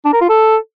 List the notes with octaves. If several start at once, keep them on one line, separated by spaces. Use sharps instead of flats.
D4
A#4
F4
A4